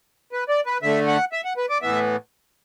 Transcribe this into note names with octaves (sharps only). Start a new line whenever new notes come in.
B4
D5
B4
D3 A3 E5
F#5
E5
F#5
B4
D5
A2 E3 B3 E5